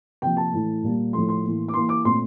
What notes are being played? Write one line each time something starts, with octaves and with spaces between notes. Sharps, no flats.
C3 F3 A#3 G5
A5
A2 E3 A3
A#2 G3 A#3
A2 F3 A3 C6
C6
A2 E3 A#3
D6
E3 A#3 C6
D6
A#2 A3 C4 C6